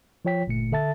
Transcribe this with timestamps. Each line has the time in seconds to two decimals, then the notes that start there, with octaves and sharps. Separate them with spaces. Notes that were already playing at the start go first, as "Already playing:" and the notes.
0.25 F3 F4 C#5 G5 B6
0.47 G1 A#2 A3 C#7
0.72 D3 A4 E5 A5 A6